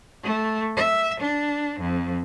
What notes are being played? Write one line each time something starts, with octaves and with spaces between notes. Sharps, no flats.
A3
E5
D4
F2